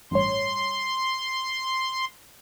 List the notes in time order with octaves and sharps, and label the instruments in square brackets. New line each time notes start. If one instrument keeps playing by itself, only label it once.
[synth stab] A1 G2 C#5 [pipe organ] C6